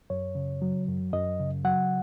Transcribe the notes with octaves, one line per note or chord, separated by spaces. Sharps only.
F#2 C#5
C#3
F#3
F#2
F#2 D#5
C#3
F#3 F#5